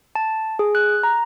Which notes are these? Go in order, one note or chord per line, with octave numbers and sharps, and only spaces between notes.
A5
G#4
F#6
A#5